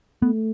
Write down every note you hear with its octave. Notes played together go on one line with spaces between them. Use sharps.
A3 B3